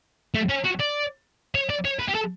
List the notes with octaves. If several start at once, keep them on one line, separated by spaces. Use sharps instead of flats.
A3
C#4
F#4
D5
C#5
D5
C#5
B4
G4
A4